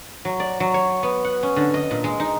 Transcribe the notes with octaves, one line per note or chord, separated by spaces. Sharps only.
F#3
D5
F#3
C#5
B3
F#5
C#4
D3
D#5
A#2
G#3
D#4